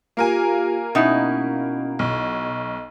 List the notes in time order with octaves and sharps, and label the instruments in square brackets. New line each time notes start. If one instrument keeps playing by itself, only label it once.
[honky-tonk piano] A#3 A#4 G#5 [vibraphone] F4 G4
[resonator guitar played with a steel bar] B2 D#4 E4 [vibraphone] C#4
[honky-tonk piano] B1 [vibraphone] C#6